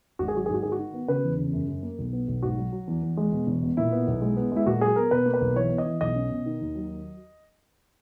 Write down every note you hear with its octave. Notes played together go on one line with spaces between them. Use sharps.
G#1 F#4
G#4
F#3 F#4
G#2 G#4
F#4
D#3 G#4
F#4
D#3
B3
C#3 B4
E2
C#3
F#2
F#2
A#3
B1
B3
B1
G#2 F#4
F#3
F#3
E2
E2
G#3
B2
E1
B2
A#2 E4
B3
B1
G#3
B3
G#3 E4
A#2 F#4
F#3 G#4
B3 A#4
B2 B4
A#3
B4
B1
E3 C#5
B3
D#5
E3
B1 D#5
C#4
B2
D#3
D#2
F#3